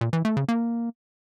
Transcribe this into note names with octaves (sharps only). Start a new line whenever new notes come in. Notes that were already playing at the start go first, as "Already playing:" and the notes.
A#2
E3
A3
C#3
A#3